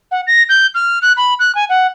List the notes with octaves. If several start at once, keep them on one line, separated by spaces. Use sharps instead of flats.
F#5
A#6
G6
F6
F#6
B5
F#6
G#5
F#5